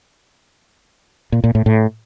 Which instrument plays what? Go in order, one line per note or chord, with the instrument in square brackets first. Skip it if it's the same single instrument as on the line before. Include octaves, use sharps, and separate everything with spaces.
[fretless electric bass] A#2
A#2
A2
A2